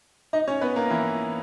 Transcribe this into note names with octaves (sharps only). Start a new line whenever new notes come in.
D#4 D#5
C#4 C#5
B3 B4
A#3 A#4
E3 E4